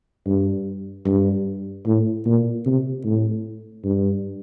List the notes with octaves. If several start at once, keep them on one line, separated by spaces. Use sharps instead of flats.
G2
G2
A2
A#2
C3
A2
G2